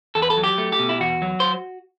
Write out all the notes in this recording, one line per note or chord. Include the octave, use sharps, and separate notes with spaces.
E2 A4
B4
A4
F#3
G4
A3
G4
B2
E4
E2 F#4
F#3
C5